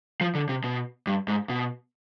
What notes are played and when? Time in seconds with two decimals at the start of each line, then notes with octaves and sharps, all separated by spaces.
0.21 F3
0.35 D3
0.49 C3
0.64 B2
1.07 G2
1.28 G#2
1.49 B2